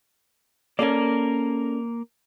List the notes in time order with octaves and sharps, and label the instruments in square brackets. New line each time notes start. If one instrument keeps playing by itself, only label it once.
[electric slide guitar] A#3 A#4 [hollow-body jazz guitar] C#4 A4 D5